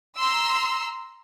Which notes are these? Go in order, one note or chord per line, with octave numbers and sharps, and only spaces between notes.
A#5 C6 E6